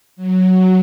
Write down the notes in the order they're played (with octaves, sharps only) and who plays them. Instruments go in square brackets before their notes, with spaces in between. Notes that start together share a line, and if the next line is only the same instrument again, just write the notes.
[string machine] F#3